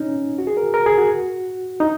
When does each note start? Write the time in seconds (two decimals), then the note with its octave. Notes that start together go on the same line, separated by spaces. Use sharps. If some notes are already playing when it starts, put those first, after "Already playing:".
Already playing: C#4 D#4
0.38 F#4
0.47 G#4
0.57 A#4
0.74 A#4
0.86 G#4
0.98 F#4
1.80 D#4